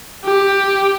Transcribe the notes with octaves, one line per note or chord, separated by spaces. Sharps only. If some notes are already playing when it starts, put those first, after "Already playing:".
G4